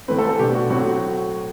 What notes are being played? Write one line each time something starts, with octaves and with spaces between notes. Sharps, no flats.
A2 E3 A3 C4 B4
A4
A4
B2 A3 D4 G4
F#4
A2 F#3 C4 F#4
F#4